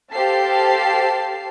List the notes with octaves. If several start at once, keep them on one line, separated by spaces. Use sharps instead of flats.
G4 A4 C5 F5 A5 C7